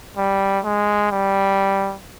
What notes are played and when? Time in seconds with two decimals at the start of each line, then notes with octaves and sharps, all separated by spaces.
0.17 G3
0.64 G#3
1.11 G3